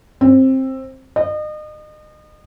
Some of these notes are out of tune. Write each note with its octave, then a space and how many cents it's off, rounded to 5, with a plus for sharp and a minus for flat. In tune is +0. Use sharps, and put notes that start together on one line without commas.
C4 +15
D#5 -35